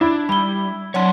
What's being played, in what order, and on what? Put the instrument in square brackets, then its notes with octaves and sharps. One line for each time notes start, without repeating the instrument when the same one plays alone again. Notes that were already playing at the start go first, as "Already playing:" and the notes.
[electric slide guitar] D4 [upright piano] E4
[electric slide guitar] G3 [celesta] B5 G7
[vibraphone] F#3 F#5 C6 [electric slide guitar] D4 C#5